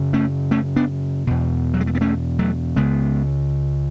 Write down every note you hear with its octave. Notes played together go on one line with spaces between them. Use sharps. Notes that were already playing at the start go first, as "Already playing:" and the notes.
Already playing: F#2 C#3
A3 C#4
A3 C#4
B3 D4
E2 B2
F#3
G#3
A3
B3
A3 C#4
F#3 A3
C#2 C#3 G#3 B3